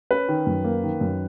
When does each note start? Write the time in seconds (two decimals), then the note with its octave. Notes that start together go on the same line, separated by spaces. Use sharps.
0.11 C#4 B4
0.29 D#3
0.47 F#2
0.64 A#3
0.84 D#3
1.01 F#2